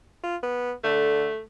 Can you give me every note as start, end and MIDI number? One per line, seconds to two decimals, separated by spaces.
0.23 0.36 65
0.43 0.73 59
0.84 1.27 50
0.84 1.40 57